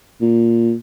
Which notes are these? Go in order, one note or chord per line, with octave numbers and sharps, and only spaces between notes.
A#2